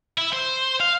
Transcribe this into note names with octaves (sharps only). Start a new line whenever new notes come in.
E4
C5
F5